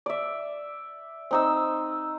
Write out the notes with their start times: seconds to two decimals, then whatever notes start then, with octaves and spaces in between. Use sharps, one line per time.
0.06 D5 E5
1.31 C4 D#4 E6